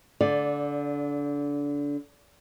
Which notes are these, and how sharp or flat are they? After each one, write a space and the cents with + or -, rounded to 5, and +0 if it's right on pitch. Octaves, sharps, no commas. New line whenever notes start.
D3 -25 D5 -5